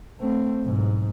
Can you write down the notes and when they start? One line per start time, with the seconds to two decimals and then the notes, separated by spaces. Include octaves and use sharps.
0.20 A3 C4
0.64 B1 G#2